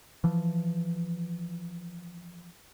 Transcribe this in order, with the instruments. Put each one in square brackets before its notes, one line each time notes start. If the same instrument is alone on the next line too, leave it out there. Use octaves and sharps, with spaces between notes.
[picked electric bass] E3 F3